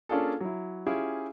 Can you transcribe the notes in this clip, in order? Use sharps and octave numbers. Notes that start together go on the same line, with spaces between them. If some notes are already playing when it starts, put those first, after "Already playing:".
A#3 C#4 D4 F4 G#4 A4
F#3 E4
C#4 E4 F4 G4 G#4